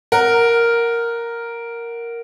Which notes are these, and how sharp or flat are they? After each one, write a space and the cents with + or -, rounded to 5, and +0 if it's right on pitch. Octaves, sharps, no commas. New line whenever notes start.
A#4 +0 F#5 +0